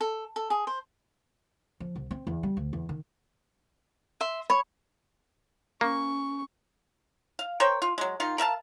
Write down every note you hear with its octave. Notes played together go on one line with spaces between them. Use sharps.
A4
A4
G#4
C5
F3
C2
C4
E2
G3
D2
E2
D#3
E5 C6
C#5 B5
A#3 C#4 C#6
F5
A#4 C5 C#5 G5
F4
F#3 G#3
D#3 F4
A#4 E5 F5 A5